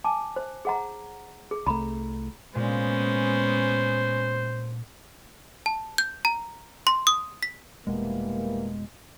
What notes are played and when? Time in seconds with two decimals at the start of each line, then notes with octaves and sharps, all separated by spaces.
0.04 G#5 A5 D6
0.36 C5
0.65 G#4 F#5 A#5
1.51 G#4
1.66 C2 A3 A#5 B5
2.55 A#2 G#3 B3 C#4 C5
5.66 A5
5.98 G6
6.25 A#5
6.87 C6
7.07 D#6
7.43 B6
7.87 F1 B2 E3 G3 G#3 A#3